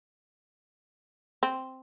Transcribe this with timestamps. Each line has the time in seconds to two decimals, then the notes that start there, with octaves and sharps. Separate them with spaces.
1.43 C4